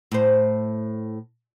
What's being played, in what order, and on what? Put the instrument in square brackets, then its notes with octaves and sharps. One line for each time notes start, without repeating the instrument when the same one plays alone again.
[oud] A2 C5